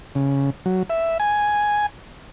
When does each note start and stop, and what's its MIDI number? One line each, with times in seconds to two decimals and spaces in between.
0.15 0.50 49
0.66 0.83 54
0.90 1.18 76
1.20 1.86 80